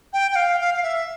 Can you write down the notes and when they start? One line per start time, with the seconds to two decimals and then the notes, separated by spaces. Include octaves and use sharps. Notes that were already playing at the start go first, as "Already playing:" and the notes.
0.13 G5
0.31 G5
0.36 F5
0.60 F5
0.74 F5
0.83 E5